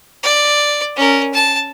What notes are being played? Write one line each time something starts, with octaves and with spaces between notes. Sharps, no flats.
D5
C#4 A#4
A5